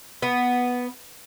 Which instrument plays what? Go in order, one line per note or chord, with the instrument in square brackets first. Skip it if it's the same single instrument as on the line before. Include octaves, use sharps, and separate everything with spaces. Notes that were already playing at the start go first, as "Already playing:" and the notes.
[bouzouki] B3